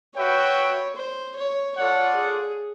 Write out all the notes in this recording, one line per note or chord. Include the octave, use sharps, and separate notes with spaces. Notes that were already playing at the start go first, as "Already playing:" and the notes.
F#4 B4 C#5 E5 G5
C5
C#5
F4 A4 C#5 D5 F#5
G#4